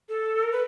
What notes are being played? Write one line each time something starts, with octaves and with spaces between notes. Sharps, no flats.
A4
A#4
B4